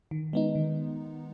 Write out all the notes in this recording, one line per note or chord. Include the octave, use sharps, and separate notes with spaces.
D#3
G#3 B3 D#4
D#3